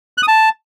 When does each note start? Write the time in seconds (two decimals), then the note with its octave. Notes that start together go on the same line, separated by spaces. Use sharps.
0.18 F#6
0.23 D#6
0.28 A5